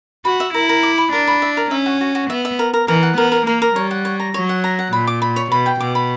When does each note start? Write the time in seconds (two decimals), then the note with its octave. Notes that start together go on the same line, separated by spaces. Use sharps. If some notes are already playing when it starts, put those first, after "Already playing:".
0.25 F#4 B5
0.40 E5
0.54 E4 A#4
0.69 A#4
0.83 D6
0.98 B5
1.13 D4 A#4
1.27 B5
1.42 E5
1.57 A#4
1.71 C#4 E5
1.86 F#4
2.01 F#4
2.15 F#4
2.30 B3 E5
2.45 E5
2.59 A#4
2.74 A#4
2.88 E3 A#4
3.03 F#5
3.17 B3 A#4
3.32 A#4
3.47 A#3 A#4
3.62 A#4
3.75 G3 C#5
3.91 F#5
4.05 C#5
4.20 A#5
4.34 F#3 C#5
4.49 F#5
4.64 A#5
4.79 F#5
4.93 A#2 B5
5.07 D6
5.22 B5
5.36 C#5
5.51 B2 B5
5.66 G5
5.80 B2 D6
5.95 B5